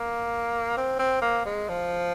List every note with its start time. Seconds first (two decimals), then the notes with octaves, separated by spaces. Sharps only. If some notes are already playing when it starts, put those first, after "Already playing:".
Already playing: A#3
0.77 C4
0.99 C4
1.22 A#3
1.45 G#3
1.69 F3